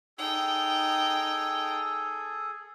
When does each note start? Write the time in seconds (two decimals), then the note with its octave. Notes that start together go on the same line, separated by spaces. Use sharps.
0.18 D#4 G#4 A4 G5